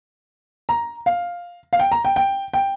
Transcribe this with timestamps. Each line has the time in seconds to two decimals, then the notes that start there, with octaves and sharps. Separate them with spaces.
0.69 A#5
1.06 F5
1.73 F5
1.79 G5
1.92 A#5
2.05 G5
2.16 G5
2.54 G5